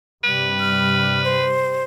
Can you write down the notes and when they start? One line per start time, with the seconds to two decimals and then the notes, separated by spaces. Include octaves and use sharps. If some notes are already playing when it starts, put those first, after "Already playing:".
0.23 G2 C3 G3 B4
0.59 F6
1.24 C5